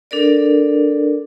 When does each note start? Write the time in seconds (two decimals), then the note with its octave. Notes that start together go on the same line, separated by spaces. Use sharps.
0.11 D4 A4 A#4 D5